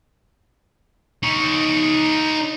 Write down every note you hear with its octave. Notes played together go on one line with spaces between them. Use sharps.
D#4 C#5